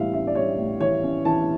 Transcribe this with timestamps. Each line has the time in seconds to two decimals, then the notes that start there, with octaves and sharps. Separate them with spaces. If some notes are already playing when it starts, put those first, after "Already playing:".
Already playing: A2 E3 G3 E5 F5
0.13 C#4 E5
0.27 D5
0.35 G3 C#5
0.58 A2
0.80 E3 C#5
1.03 C#4
1.25 E3 A5